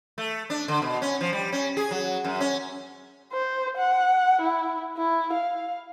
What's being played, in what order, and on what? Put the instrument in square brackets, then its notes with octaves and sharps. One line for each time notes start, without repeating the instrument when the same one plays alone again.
[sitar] A3
D4
D3
B2
C#4
F3
G3
C#4
G#4
F#3
F#2
C#4
[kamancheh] C5
F#5
E4
E4
F5